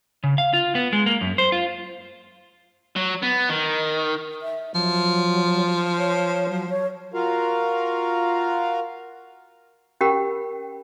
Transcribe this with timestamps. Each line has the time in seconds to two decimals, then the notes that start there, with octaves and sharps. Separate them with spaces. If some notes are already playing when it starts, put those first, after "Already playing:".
0.24 C#3
0.38 F5
0.53 F4
0.75 B3
0.93 G#3
1.06 A#3
1.21 F#2
1.38 C5
1.52 F4
2.96 F#3
3.23 B3
3.49 D#3
4.42 E5
4.75 F3 F#3
5.98 C#5
6.49 F#3
6.70 C#5
7.14 F4 F#4 A#4 F5
10.01 C#4 G4 A#4 F#5 G5 B5